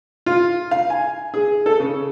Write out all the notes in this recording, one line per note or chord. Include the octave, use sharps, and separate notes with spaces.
F4
F5
G#5
G#4
A4
C#3